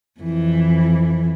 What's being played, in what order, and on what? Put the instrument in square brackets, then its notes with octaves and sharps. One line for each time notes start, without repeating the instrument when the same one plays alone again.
[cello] F2 E3